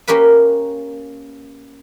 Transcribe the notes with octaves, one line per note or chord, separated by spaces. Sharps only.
A#3 C#4 G4 A#4 B4